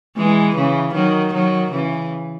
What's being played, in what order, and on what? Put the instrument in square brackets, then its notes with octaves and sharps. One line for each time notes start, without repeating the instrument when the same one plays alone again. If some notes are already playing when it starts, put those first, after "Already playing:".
[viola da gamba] E3 G#3
C#3 E3
D#3 F#3
D#3 F#3
C#3 E3